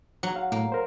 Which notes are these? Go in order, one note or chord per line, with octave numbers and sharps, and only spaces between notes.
F#3
F5 F#5
A2 A#3
A#4 C5